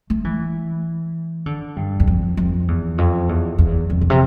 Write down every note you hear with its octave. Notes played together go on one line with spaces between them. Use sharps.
A3
E3
D3
G2
E2
F2
F2
E2
F2
E2
E2
F2
A#2
C3